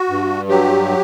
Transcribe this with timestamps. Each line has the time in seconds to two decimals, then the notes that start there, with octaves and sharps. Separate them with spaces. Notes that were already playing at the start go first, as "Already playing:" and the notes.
Already playing: F#4
0.10 G2
0.49 F#3 G4